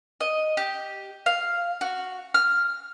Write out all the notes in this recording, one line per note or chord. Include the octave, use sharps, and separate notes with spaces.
D#5
G4
F5
F#4
F6